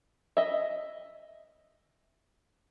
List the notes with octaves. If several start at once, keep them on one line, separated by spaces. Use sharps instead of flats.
D#5 E5